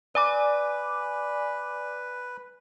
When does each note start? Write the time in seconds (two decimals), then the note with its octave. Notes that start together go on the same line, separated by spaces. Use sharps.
0.15 B4 D5 G#5 D6